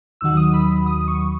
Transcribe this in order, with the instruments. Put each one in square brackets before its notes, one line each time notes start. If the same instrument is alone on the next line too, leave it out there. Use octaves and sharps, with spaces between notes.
[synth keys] D#2 D#3 F#3 E6
D#6
B5
D#6
C#6